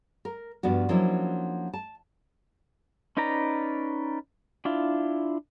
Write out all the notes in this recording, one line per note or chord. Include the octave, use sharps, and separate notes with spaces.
A#4
G2 F3 B3 D4 F#4
F3 F#3 A#3 C#4 D4 E4
A5
C#4 D#4 B4 D5 A#5
D4 E4 F4